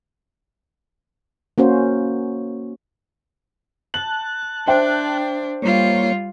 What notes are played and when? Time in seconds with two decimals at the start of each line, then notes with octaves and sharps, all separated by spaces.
1.58 A#3 C#4 F#4 C5
3.94 A5 F#6 F#7
4.68 D4 C5 E5 G5
5.62 G3 A#3 F4 C#5